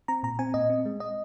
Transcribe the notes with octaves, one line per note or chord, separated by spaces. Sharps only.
C4 A#5
A#2 A#5
C4 G#5
A#2 D#5
C4
G#3
D#5